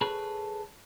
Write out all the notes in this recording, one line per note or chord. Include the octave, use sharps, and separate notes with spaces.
G#4 A4 B4 C#5 B5